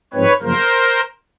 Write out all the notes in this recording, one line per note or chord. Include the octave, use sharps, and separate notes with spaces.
G#2 F3 G#3 C4 B4 C#5
F#2 C#3 F3 A#3 A#4 C5